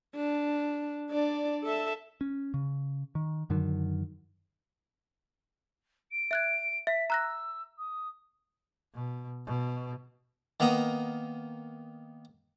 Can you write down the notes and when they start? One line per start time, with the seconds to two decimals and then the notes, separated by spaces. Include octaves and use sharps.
0.16 D4
1.10 D4 D5
1.64 A4 E5
2.21 C#4
2.54 C#3
3.15 D#3
3.50 F#2 D3 D#3 F#3
6.11 D7
6.31 E5 F#6 G#6
6.87 E5 B6
7.10 A#5 E6 F#6 A#6
7.78 D#6
8.94 B2
9.46 B2
10.60 D#3 A#3 B3 A#5 D#6